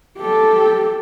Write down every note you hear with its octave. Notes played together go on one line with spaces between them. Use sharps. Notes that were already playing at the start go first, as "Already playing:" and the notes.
G4 A4